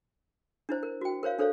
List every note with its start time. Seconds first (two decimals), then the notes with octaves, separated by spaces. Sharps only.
0.69 D4 E4 C5
0.83 A#4
1.01 F#4 G5
1.23 A#4 C5 C#5 F5
1.39 D4 A4 C5 C#5 F5